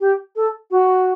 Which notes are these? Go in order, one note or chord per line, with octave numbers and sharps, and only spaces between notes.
G4
A4
F#4